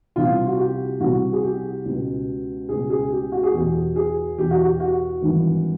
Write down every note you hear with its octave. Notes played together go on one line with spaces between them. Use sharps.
C2 C3 F3 F4
F#4
G4
C2 C3 F3 F#4
G#4
G4
C#2 B2
C#2 B2 G#4
G#4
G4
F#4
G#4
E2 B2 G4
G#4
E2 B2 G4
F#4
G4
F#4
G#1 G2 E3